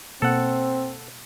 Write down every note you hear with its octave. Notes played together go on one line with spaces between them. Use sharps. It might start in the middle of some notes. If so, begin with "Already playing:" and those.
B2 A#3 C4 A4 F#5